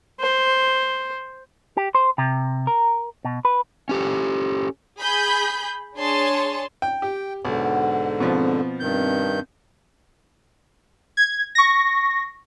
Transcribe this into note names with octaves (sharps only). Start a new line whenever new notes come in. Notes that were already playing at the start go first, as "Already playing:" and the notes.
C5
G4
C5
C3
A#4
B2
B4
C#4 G4 A4
G#4 B5 G6
D4 G#4 C#5 A5 C6
G5
G4 G5
B1 G#2 D3 F#5
B2 F3 C4
G2 D#3 G6
G#6
C#6 A#6